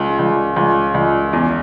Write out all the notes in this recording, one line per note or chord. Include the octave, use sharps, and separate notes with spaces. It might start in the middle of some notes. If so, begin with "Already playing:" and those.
Already playing: C#2
C#2
C#2
C#2
E2